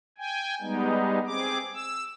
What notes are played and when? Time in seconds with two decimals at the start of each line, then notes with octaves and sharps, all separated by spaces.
0.18 G5 G#5
0.61 G3 G#3 B3 D#4
1.27 C4 G#4 D6
1.74 E6